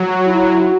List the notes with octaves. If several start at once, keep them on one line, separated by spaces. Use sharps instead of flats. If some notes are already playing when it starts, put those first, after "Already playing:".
Already playing: F#3
F#4
E4
F#4